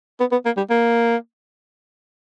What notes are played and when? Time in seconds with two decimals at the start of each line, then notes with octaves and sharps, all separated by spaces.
0.20 B3
0.32 B3
0.46 A#3
0.57 G3
0.70 A#3